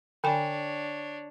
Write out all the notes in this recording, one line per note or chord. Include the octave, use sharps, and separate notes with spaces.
D3 D4 C#5 G5 G#5